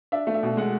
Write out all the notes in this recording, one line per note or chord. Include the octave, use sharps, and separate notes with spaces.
D4 E5
A3
E5
B2
G#3 F#5